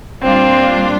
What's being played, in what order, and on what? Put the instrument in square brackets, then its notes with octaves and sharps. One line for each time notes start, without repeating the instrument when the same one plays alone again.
[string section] A#2 G3 D4 F4 [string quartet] C4